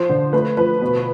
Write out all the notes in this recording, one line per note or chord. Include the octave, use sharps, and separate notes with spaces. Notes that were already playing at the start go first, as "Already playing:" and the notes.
Already playing: F3 C5
D3
A3 B4
F3 B4
B2